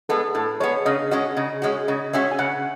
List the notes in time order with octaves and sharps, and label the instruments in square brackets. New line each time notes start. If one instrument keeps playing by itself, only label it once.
[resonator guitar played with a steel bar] G#3 B3 [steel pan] A4
[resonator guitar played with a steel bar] A2 [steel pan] A4
[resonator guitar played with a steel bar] G#3 B3 [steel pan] C#5
[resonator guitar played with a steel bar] C#3 [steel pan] D#5
[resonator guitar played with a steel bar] G#3 C#4 F#4 [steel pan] D#5
[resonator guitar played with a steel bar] C#3 [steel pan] D#5
[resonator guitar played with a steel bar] G#3 C#4 F#4
[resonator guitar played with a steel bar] C#3 [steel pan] D#5
[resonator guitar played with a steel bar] G#3 C#4 F#4 [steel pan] E5
[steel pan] G#5
[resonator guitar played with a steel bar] C#3 [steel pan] F#5